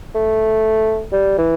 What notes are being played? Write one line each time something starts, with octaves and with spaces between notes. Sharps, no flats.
A3
G3
E3